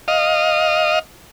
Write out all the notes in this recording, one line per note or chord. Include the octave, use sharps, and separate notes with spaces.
D#5 F5